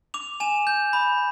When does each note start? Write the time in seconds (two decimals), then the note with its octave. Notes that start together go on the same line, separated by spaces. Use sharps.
0.14 D6 F7
0.40 G#5 E7
0.67 G6
0.93 B5